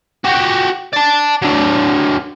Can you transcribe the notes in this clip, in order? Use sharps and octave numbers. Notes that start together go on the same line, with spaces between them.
F#4 G4
D5 A5
F#3 D4